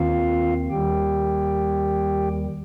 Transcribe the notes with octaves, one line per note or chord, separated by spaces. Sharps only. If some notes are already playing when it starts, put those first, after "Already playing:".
Already playing: D#2 D#3 C4 F4 F5
D#2 D#3 G3 G4 G5